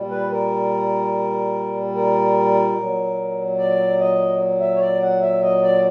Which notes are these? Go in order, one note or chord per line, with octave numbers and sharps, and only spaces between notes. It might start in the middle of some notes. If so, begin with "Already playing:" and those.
Already playing: A#2 G3
B4
A#4
A#4
A#2 F#3
D5
D#5
E5
C#5
D5
F#5
E5
D#5
D5